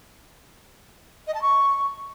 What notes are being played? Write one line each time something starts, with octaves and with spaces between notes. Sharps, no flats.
D#5
A5
C#6